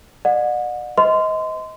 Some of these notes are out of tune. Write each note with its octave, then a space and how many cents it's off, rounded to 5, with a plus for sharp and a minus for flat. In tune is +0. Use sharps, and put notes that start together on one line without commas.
D5 +45 F#5 -35
B4 +45 D#5 +25 C6 -25